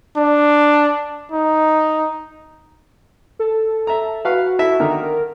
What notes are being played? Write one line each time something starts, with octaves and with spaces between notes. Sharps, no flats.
D4
D#4
A4
E5 A#5
F#4 B4 F5
E4 A4 E5
D3 D#3 A#4